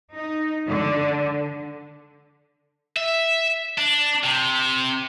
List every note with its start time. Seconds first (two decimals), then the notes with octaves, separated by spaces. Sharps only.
0.14 D#4
0.67 D3
2.96 E5
3.78 D4
4.24 C3